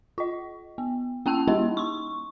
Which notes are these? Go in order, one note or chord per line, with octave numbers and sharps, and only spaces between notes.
F4 D#5
B3
A#3 C#4 G5 A5 E6
G3 A#3 D#4 E4
C6 C#6